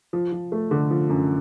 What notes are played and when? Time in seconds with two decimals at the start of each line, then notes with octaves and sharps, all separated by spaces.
0.13 F3
0.32 F3
0.52 A3
0.71 D3
0.91 F3
1.09 F#2